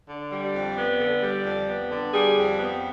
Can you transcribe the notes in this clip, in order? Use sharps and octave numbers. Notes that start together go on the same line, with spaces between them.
D3
G3
D5
F2
B3
D3
G3
F2
B3
D3
G3 G#4
F2
B3